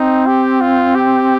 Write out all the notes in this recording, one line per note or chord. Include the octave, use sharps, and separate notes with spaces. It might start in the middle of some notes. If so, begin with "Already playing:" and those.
Already playing: C4 D#4
G4
F4
G4